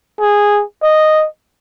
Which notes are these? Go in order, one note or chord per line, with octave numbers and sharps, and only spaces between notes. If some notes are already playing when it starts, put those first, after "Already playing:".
G#4
D#5